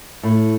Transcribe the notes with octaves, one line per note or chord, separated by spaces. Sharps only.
A2